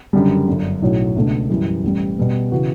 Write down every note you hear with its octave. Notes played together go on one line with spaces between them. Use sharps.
F#1 F#2 D3 G3
G1 F#2 D3
B1 A2 F#3 C#4
C#2 B2 A3 D4
F#2 E3 G3
A1 A2 E3 G3
B2 G3 B3
C#3 E3 B3 F#4